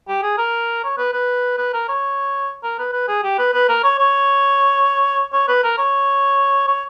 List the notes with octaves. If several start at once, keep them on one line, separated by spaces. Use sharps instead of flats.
G4
G#4
A#4
C#5
B4
B4
B4
A#4
C#5
A#4
B4
B4
G#4
G4
B4
B4
A#4
C#5
C#5
C#5
B4
A#4
C#5
C#5